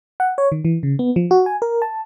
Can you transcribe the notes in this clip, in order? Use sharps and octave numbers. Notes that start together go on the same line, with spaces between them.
F#5
C#5
D#3
E3
C#3
B3
F3
F#4
G#5
A#4
A5